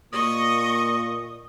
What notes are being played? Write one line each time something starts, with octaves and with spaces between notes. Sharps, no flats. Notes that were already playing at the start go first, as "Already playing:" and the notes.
A#2 A#3 D#5 C#6 D#6